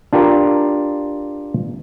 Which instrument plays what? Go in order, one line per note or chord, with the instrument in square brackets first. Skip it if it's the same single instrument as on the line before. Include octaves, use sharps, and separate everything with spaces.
[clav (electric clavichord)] D4 F4 G4 A#4